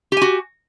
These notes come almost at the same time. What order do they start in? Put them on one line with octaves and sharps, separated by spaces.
G4 G#5 F#4